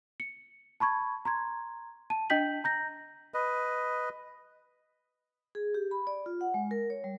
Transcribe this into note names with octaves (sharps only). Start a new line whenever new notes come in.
C#7
A5 B5 C#6 G#6
A#5 C6 G#6
A5 D#7
D4 D#5 G5 G6 B6 F#7
A#5 G6 A#6
B4 D#5
G#4
G4
B5
D5
F4
F#5
G#3
A#4
C#5
G3